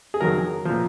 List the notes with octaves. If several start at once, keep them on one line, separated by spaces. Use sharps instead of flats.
G#4
F2 D#3 F#3 A#4
A#2 F3